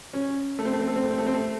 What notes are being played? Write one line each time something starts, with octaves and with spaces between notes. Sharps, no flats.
C#4
A3
C4
A3
C4
A3
C4
A3
C4
A3
C4
A3